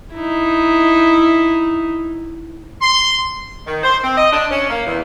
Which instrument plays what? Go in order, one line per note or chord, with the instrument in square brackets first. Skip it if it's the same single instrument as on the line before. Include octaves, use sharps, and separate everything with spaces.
[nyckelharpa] D#4 E4
[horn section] C6
[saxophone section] D#3
C5
C4
D#5
D4
C#4
A#3
E2